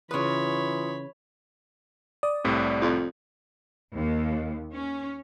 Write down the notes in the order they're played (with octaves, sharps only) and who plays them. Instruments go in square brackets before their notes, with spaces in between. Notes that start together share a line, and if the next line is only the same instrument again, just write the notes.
[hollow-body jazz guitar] C#3 B4 [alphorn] E3 [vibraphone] F4 C6 D#6 [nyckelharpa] C#5 B5
[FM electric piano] D5 [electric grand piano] D#6
[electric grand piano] C2 A2 C3
[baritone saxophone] F2
[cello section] D#2
C#4